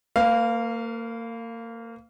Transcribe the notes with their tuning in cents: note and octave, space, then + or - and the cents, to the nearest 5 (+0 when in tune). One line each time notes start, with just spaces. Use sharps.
A#3 -30 B4 +20 F5 -5